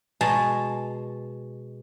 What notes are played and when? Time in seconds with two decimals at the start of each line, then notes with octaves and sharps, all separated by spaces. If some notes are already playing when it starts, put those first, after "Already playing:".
0.21 B2 G#3 A5 A#5